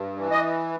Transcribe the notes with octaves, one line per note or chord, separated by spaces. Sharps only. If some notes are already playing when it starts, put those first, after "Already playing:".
Already playing: G2
E3
D#5